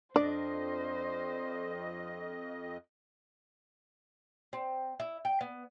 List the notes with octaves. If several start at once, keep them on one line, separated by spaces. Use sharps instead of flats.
F2 D4 C5 D5 D#5
C4
E4
G5
B3